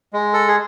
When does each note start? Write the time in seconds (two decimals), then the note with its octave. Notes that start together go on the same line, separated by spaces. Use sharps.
0.13 G#3
0.34 A4
0.48 G#4